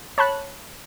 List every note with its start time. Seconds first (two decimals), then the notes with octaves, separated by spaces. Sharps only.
0.18 C#5 A5 B5 F#6